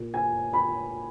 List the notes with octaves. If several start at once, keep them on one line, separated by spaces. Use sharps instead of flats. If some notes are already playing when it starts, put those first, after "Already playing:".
Already playing: A#2
G#5
B5